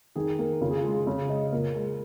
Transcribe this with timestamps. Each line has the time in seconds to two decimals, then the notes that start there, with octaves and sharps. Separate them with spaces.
0.16 D#3 G#4
0.39 A#3
0.61 C#3 F4
0.71 G#4
0.77 F4
0.84 G#3
0.92 G#4
1.06 C#3 C#5
1.29 G#3 D#5
1.52 A#2 A#4
1.75 G#3